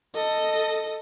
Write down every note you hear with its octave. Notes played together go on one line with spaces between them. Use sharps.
A4 D#5